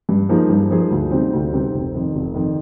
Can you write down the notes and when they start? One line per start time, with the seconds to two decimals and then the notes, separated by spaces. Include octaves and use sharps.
0.09 G2
0.29 F3 A#3 D#4 G#4
0.50 G2
0.70 F3 A#3 D#4 G#4
0.90 D2
1.11 C3 G3 C4 D#4
1.33 D2
1.52 C3 G3 C4 D#4
1.74 F1
1.94 F2 D#3
2.15 F1
2.34 F2 D#3